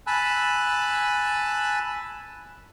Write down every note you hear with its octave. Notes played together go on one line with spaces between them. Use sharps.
G#5 A5 B5 E6 F#6